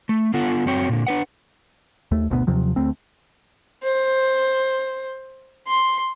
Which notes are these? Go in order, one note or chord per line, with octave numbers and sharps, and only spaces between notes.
A3
D3 B3 F4 A4 F#5
F#2 C4 F#4 C#5 G5
A#2 D3
D4 B4 F#5
D#2 A3
G#1 D2 B2 B3
D#2 C3 F3 F#3
D2 A3 C4
C5
C6